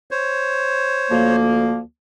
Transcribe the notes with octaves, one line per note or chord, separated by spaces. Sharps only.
C5 C#5
D2 F3 A#3